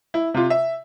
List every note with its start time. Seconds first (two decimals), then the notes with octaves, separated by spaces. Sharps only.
0.14 E4
0.34 C3 F4
0.50 E5